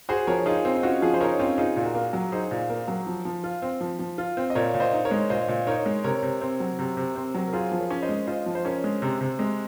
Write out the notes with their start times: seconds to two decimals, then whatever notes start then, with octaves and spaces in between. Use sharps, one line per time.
0.09 F#4 G#4 C5
0.27 F3 A#4 C#5
0.46 D#4 F4 G#4
0.65 C4
0.75 D#4
0.83 C#4 F4 F#4
1.02 F3 F4 G#4
1.14 C5
1.20 D#4 A#4 C#5
1.39 C4 C#4 F4
1.57 D#4 F4 G#4
1.76 A#2
1.83 F#4 A#4
1.94 A#3
2.13 F#3
2.32 D#4 G#4 C5
2.51 A#2
2.69 A#3
2.88 F#3
3.06 F3
3.25 F3
3.44 F4
3.62 C4
3.81 F3
3.99 F3
4.18 F4
4.37 C4
4.50 D#5
4.55 A#2 A#4 C#5
4.74 A#2
4.80 C5 D#5
4.93 D#4
5.05 A#4 C#5
5.11 G#3
5.30 A#2 C5 D#5
5.48 A#2
5.67 D#4 A#4 C#5
5.86 G#3
6.04 C3 A#4 C#5
6.23 C3
6.41 C4
6.60 F#3
6.79 C3
6.97 C3
7.16 C4
7.34 F#3
7.48 A#4
7.53 F4 G#4 C5
7.72 F3
7.78 A#4 C#5
7.91 C#4
8.02 C5 D#5
8.09 G#3
8.27 F4 C5 D#5
8.46 F3
8.55 C5
8.65 C#4 A#4 C#5
8.84 G#3
9.02 C3
9.21 C3
9.39 G#3